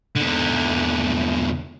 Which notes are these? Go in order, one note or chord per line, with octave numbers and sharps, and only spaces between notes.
E2 D3